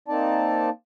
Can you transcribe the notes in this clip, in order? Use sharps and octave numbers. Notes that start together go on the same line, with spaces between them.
A#3 C4 D#4 D5 A5